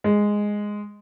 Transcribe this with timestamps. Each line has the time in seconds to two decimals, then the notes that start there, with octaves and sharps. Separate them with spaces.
0.04 G#3